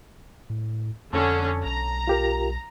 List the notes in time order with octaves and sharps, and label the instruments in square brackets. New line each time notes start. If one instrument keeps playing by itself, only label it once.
[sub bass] A2
[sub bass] F2 [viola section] D3 C#4 [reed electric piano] A5
[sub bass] B1 [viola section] A#5
[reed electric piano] F4 G4 A#4